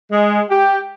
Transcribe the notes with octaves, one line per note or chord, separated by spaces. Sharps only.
G#3
G4